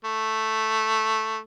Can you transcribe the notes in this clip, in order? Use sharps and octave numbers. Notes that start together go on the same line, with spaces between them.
A3